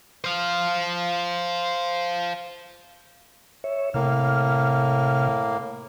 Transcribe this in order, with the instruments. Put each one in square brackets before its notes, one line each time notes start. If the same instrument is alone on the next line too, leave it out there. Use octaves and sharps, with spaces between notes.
[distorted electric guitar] C5 F5
[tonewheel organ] C#5 E5
[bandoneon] A2 A#3 [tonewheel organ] C3 F6